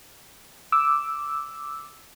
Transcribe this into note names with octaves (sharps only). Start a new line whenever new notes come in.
D6 E6